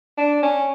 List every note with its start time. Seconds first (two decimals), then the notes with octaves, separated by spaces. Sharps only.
0.18 D4
0.43 C#4